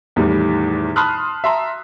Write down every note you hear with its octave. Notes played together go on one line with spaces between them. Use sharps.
E2 A2 D#3 G3
A5 B5 C6 D#6 F6 F#6
E5 A5 A#5 C6